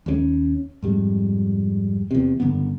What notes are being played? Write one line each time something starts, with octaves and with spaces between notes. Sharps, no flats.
D#2 G3 C#4
F2 G#2 G3
E2 C3
F#1 G2 D3 B3